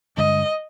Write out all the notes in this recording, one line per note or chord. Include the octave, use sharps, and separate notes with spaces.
G2 D3 G#3 D4 D#5